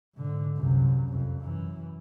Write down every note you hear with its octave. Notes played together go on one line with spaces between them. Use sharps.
G#2 D3
C2 F#2
C2 F2
F#2 E3